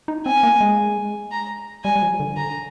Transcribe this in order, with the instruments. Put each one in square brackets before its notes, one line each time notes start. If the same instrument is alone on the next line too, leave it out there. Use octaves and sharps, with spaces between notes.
[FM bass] D#4
[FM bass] C4 [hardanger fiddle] G#5
[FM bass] A#3
G#3
[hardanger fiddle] A#5
[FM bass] G3 [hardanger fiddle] G#5
[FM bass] G3
F3
D3
[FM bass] D3 [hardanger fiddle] A#5